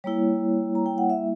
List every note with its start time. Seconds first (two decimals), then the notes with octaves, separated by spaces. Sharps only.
0.04 G3 A#3 E4 C#5
0.75 A#5
0.86 G5
0.98 F#5
1.10 E5